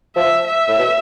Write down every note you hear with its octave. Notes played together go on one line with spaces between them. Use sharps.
F3 E5
E5
A2
B2